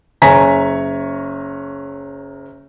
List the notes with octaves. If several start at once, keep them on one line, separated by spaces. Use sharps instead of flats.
F#1 C#5 G#5 A#5 B6